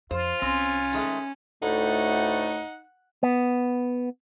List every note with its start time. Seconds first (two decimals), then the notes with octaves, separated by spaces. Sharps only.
0.11 F2 F4 C5
0.42 C2 C4 C#4
0.93 D#3 G#3 A3
1.62 D2 A2 A3 D#4 F#5
3.23 B3